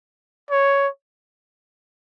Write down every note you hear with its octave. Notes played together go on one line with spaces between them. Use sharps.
C#5